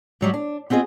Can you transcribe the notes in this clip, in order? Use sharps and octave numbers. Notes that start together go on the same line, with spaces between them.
G#2 F#3 G3
D4
B3 C4 F4 G#4 D#5